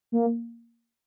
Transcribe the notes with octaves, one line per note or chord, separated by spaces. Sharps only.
A#3